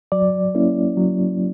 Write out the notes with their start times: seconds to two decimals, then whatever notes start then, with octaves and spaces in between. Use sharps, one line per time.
0.12 F#3 D5
0.55 A#3 C#4 E4
0.97 F#3